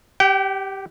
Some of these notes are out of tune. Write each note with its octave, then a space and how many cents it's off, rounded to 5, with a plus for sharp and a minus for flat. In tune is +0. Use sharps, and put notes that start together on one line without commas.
G4 +0 G5 -40